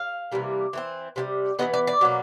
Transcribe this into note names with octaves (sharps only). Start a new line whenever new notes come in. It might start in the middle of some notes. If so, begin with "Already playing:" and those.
Already playing: F5
C3 E3 G3 A#3
E3 A3 C4
C3 E3 G3
E3 G#3 B3 D#5
D5
D5
B2 F#3 A#3